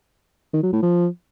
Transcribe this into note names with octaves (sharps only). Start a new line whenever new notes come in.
D#3
F#3
A2
F3